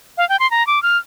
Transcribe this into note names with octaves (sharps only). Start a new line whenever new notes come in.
F5
G5
C6
A#5
D6
F6